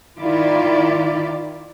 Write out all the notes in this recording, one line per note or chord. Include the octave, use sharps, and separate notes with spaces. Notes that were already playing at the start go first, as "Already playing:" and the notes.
D#3 E4 F4 D5